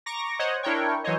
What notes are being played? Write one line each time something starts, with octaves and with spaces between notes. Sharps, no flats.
A#5 C#6 D6 A#6
C5 C#5 D#5 F#5
D4 E4 A#4 C#5 G5 C#6
E3 F#3 C5 C#5 D#5